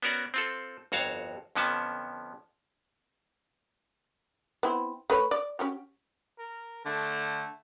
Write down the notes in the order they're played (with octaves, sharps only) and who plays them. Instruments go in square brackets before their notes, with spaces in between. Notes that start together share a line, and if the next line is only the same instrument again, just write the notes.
[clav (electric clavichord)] B3 C#4 F#4 A#4 D5
C4 F4 A4
G1 F2 F#4 C#5 F5 A5
F2 D3 F3 B3 C#4 A5
[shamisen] B3 C4 E4
A3 B4 C#5
D5
C#4 F#4 G4
[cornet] A#4
[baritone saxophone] D3 [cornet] A3